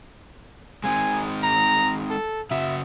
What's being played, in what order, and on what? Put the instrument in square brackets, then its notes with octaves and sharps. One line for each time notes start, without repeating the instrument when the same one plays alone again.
[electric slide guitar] G#3 C4 D#4 [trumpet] G#5
[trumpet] A#5
A4
[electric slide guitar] C#3 F#4 [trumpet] E5